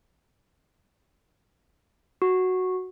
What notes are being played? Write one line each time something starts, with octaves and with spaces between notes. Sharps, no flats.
F#4